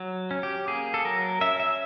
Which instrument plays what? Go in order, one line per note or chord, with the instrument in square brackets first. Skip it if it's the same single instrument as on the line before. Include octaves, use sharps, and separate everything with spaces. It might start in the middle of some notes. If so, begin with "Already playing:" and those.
Already playing: [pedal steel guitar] F#3
C#4
G4
A#3 G#4
A4
F#3 A#4
C#4 E5
E5